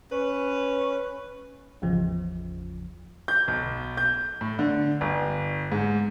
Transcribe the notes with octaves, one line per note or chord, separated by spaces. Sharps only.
C#4 B4
G#1 E2 C#3 F3
G6
B1
G6
A2
D3
G1
G#2